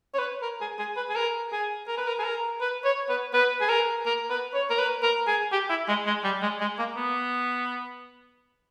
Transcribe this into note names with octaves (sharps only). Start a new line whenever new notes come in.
C#5
B4
A#4
G#4
G#4
B4
G#4
A#4
G#4
A#4
B4
A#4
G#4
A#4
B4
C#5
B4
B4
G#4
A#4
A#4
B4
C#5
A#4
B4
A#4
G#4
G4
E4
G#3
G#3
G3
G#3
G#3
A#3
B3